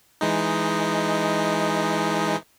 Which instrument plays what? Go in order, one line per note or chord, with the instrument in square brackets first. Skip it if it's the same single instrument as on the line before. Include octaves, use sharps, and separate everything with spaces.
[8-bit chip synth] E3 G#3 D#4